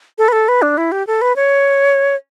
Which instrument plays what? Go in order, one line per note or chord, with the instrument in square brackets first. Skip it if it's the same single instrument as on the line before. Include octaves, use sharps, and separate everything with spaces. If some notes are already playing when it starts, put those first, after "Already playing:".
[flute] A4
B4
A4
B4
D4
E4
G4
A4
B4
C#5